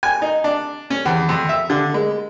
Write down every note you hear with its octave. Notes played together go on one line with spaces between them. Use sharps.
G#5
D#4
D4
C#4
E2
F2
E5
D3
G#3